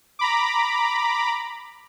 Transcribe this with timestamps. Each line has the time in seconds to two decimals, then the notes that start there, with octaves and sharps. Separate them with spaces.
0.19 A#5 B5 D6